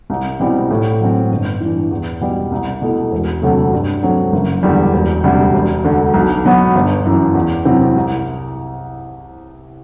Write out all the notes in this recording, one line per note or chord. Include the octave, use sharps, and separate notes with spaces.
C2
B2 G3 C4 E4
A2
F#3 C4
G1
G2 E3
E2
B2 G3
C2
B2 A3 E4
E1
D2 C3 F#3 A3
G2
F#3 A3 C4
F#1
E2 D3 G3
E1
D2 C3 G3
E1
D2 D3
B1
B2 F#3 B3
G1
F#2 E3
E2
C3 F#3 C4 E4
C2